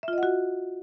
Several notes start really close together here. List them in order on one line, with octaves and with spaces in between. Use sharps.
E5 F4 D#5 F#5 F#4